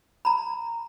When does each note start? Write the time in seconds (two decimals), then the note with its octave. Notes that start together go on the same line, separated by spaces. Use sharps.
0.25 A#5 B5